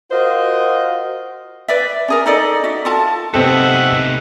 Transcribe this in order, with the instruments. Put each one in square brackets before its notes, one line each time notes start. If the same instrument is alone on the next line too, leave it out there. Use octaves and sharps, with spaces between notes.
[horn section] F4 F#4 A#4 C5 D#5 F5
[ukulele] B4 D5 E5
C#4 G#4 A#4
D#4 A4 D5 D#5
F#4 E5
F4 A4 A5
[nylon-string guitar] C3 B3 [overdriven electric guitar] A3 D#4 [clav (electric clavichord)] C4 A4 [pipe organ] E5 F#5